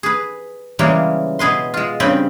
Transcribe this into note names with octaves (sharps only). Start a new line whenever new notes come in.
G#4 B4
C#3 E3 G3 G#3 A#3 C#4
B2 G#4 B4 C6
G#3 F4
G2 C#3 C4 G5 B5